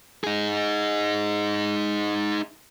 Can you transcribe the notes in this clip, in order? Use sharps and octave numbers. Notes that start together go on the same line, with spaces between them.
D#4 G#4